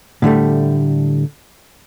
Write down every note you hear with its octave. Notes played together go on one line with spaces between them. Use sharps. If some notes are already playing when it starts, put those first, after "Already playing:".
A2 D3 G3 A3